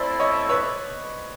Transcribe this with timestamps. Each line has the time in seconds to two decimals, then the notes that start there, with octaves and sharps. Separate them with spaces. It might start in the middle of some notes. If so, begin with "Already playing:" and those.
Already playing: A3 C4 E4 A4 C5 D5
0.20 C#5 D#5
0.49 B4 C#5